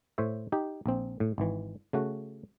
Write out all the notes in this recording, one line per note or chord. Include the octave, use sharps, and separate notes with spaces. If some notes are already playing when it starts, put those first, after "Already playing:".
A2 C5 C#5 E5
D#4 G4
A#1 C4
A2
G#1 E3
C#3 A3 F#4